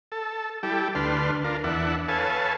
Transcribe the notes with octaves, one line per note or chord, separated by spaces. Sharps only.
A4
G3 E4 G4 A4
D2 D4 B4 C6 F6
D4 F4 A#4
E2 D4 E5 F#5
A4 B4 C#5 F5 G#5 A5